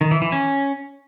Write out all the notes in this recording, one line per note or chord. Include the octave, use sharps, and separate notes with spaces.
D#3
E3
E3
C#4